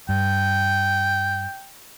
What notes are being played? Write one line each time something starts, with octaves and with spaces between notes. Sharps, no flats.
G2 G5